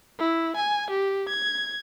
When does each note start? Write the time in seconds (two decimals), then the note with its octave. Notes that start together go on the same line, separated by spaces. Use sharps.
0.19 E4
0.56 G#5
0.90 G4
1.29 G#6